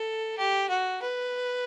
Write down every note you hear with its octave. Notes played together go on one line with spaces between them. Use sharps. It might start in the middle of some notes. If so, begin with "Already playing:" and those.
Already playing: A4
G4
F#4
B4